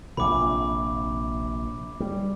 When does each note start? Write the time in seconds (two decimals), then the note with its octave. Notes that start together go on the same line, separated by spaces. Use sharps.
0.17 A#1 C3 B5 D6
2.00 G3